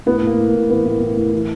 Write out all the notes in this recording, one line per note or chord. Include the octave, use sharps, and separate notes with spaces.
A2 B3
A2 A#3
A2
A2
E3 B3
A2
A2
A2
E3